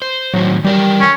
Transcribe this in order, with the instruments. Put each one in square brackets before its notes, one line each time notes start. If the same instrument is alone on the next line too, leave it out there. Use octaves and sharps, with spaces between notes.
[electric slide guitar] C5
[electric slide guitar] A2 D#3 C4 [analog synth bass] F#3
[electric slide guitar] E3 A#4 G5 [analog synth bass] G3
[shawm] C#4